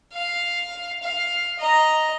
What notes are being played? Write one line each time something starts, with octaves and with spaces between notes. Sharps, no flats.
F5
F5
D#5 A#5